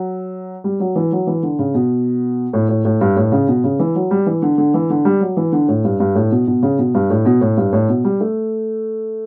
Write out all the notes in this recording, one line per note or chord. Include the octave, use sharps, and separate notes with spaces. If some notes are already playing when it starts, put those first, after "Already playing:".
Already playing: F#3
G3
F#3
E3
F#3
E3
D3
C#3
B2
A2
A2
A2
G2
A2
C#3
B2
C#3
E3
F#3
G3
E3
D3
D3
E3
D3
G3
F#3
E3
D3
A2
G2
G2
A2
B2
B2
C#3
B2
G2
A2
B2
A2
G2
A2
B2
G3
A3